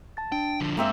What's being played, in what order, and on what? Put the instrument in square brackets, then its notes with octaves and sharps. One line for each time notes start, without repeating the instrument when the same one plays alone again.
[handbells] A5 A6
[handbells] D4 [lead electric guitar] G5
[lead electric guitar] D3 F3
[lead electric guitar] G#2 [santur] A#3 C4 E5